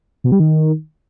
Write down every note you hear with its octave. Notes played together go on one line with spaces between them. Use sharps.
B2
G3
D#3